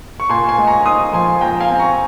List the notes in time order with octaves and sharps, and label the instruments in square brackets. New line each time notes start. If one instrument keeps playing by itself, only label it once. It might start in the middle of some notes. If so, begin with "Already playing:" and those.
[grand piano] C#6
A#2 G#5 C6
G#5 C6
G#3
A#5 C#6
D#4 C6 D#6
F3 G#5 C6
A#2 G5 A#5
F5 G#5
C4
A#5 C#6